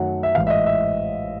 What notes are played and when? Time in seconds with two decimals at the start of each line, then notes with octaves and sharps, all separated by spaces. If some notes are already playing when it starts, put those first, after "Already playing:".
Already playing: F#2 D#3 F#3 A3 F#5
0.23 E5
0.35 A1 G#2 E3 F5
0.47 E5
0.50 D#5
0.66 E5